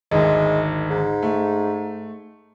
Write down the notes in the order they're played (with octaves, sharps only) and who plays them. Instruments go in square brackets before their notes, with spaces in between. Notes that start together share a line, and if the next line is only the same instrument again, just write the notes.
[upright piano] G#1 D2 [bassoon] G#3
[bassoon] G#2
[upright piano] A3